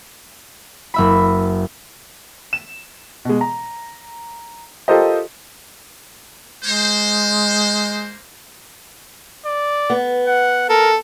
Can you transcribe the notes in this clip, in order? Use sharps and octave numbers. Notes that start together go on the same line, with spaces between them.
F#1 E5 B5
E7
B2 G#3
A#5
F4 G4 A4 A#4 C5 D#5
G#3 A#3 C5
D5
B3
F#5
A4 A#4